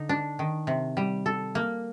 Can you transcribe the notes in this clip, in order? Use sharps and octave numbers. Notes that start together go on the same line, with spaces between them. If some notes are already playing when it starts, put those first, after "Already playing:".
Already playing: D3 D#4
D4
D#3
C3
G3
A4
A#3